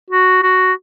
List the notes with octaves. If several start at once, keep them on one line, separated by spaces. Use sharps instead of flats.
F#4
F#4